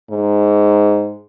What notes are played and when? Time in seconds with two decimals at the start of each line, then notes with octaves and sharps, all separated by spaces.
0.11 G#2